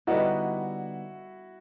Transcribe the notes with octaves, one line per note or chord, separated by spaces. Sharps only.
D3 G3 B3 D#4 E4 F#4